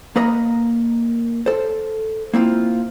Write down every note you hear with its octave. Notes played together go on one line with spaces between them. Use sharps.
A#3 A#4 B4 D#5 A#5
A4 C5
A#3 C4 E4 F4